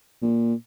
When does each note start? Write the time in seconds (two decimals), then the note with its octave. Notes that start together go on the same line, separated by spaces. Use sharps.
0.22 A#2